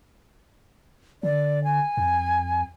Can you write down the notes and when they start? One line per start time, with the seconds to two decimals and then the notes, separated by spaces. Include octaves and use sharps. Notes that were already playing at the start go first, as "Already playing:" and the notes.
1.23 D3 D5
1.64 G#5
1.97 F2